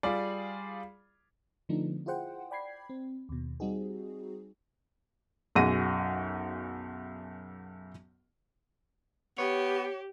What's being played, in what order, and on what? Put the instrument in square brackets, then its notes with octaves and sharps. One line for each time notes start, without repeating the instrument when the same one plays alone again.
[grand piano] G3 F4 G#4 D5
[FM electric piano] D3 F3 A3 B3 D4 D#4
E4 F4 G#4 C5 F#5 G5
D5 G5 B5 G#6 C7
C4
D#2 B2
G3 C4 D#4 F#4 G#4
[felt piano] B1 F#2 G#4 F#5 A#6 D#7
[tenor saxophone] B3 [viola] G4 [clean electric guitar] C#5